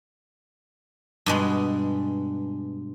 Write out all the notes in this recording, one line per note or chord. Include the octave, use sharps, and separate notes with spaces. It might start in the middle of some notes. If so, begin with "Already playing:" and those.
G2 B2 G#3